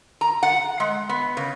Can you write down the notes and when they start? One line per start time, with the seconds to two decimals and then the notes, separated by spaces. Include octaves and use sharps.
0.21 A#5
0.43 F#5
0.80 G#3
1.09 B3
1.37 C#3